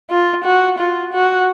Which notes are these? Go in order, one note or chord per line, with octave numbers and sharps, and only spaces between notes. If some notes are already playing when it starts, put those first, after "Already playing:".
F4
F#4
F4
F#4